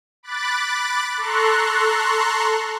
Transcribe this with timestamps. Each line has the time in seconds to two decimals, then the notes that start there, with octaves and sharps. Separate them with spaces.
0.23 B5 D6 F#6 A6
1.17 A4 A#5 C6 C#6 F#6